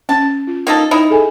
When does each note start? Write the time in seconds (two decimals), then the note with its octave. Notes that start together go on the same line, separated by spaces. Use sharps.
0.09 C#4 A5
0.47 F4
0.67 A#3 D#4 A4
0.91 D#4 E4 B5
1.10 G#4 A4 G#5